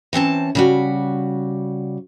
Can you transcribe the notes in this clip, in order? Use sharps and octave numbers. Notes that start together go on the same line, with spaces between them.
E3 C4 C#4 A5
C#3 G3 F#4